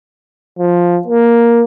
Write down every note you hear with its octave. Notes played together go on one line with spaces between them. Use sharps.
F3
A#3